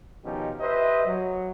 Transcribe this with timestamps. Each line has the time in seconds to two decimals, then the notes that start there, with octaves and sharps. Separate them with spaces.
0.24 B2 D#3 F3 C#4 D#4 G4
0.61 G4 B4 C5 D#5 E5
1.06 F#3